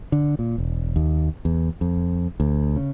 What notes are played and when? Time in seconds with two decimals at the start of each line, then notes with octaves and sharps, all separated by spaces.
0.12 D3
0.39 A#2
0.58 E1
0.96 D#2
1.45 E2
1.81 F2
2.40 D2
2.76 C#3